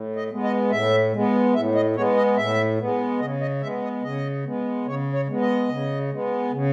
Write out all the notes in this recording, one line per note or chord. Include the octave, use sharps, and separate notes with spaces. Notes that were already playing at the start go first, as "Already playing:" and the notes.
Already playing: A2
D#5
G#3 B3
D#5
A2 E5
G#3 B3
A2 E5
D#5
G#3 B3 C#5
D#5
A2 E5
G#3 B3
C#3 D#5
D#5
G#3 B3 E5
D#5
C#3 D#5
G#3 B3
C#3 C#5
C#5
G#3 B3
D#5
C#3
G#3 B3
C#3